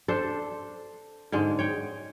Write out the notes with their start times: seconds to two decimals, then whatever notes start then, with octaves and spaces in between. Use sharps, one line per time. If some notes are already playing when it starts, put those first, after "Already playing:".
0.08 D4 A4 C5
1.32 G#2 D3 G#3
1.59 C#5 G5